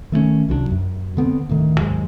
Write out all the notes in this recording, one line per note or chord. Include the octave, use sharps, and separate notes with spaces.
D#3 A3 A#3 C#4
C2 F#3 G#3 D4
F#2
D3 B3 C4
D2 A2 D#3
D#2 G#2 F#3 G#3